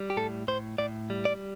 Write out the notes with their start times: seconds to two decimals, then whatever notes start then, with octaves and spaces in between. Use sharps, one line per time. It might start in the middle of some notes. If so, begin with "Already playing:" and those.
Already playing: G3
0.10 G4
0.17 A2 A4
0.48 A2 C5
0.78 A2 D5
1.10 G3
1.25 D5